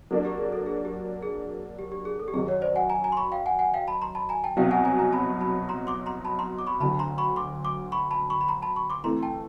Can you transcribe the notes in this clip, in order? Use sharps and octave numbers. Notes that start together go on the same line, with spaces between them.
F#3 A#3 D4 A4
G4
G#4
A4
G#4
G4
G#4
G4
G4
G#4
A4
G4
F#2 D#3 F#3 G#4
C#5
C5 D5
F#5 G#5
G#5 A#5
G#5 A#5
C6
B5 C#6
F5 G5
F#5 G#5
F#5 G#5
F5 G5
A5 B5
A#5 C6
A5 B5
G#5 A#5
G5 A5
C2 B2 F#3 F5 G5
F#5 G#5
G#5 A#5
G#5 A#5
A5 B5
A5 B5
A#5 C6
C6 D6
A#5 C6
A5 B5
A#5 C6
D6
B5 C#6
D2 D3 F#3 A5 B5
A#5 C6
B5 C#6
C6 D6
C6 D6
B5 C#6
A5 B5
B5 C#6
B5
A#5 C6
A5 B5
B5 C#6
C6 D6
E3 A3 C4 A#5 C6
G5 A5